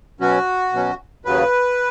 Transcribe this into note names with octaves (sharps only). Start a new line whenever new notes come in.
B2 F#3 C#4 F#4
B2 F#3 C#4
D#2 C#3 F#3 B4